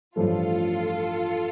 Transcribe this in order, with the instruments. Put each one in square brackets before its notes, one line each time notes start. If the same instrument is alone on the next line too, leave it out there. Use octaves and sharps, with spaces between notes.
[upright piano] A1 G2 F3 A3 [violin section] F4 A4